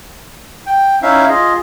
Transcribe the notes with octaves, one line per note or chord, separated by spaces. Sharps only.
G5
C#4 D#4 E4 E5 F5
F4 G#4 D#5